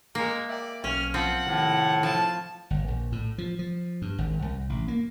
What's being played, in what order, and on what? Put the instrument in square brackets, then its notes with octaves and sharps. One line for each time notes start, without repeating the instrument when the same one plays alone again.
[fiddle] G#3 A#4 [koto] A#3
[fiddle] D5 [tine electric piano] E5 G5
[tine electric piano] B1 [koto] C#4 [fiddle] F6
[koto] F3 C4 [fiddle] F#5
[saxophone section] A2 [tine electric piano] C3 D#3
[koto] F3 [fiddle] A5
[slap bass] G1
A#1
A2
F3
F3
G2
G#1
C2
A1
A#3